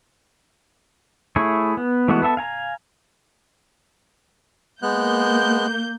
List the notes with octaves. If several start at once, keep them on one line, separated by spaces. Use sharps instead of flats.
A3 E4 G#4 C#5
B3
E3 G#3 A3 B3 F#4
B3 A4 E5 A5
F5 G#5 A#5
G#3 A#3 B3 F#6 G6